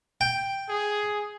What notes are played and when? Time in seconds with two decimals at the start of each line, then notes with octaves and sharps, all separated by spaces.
0.21 G5
0.69 G#4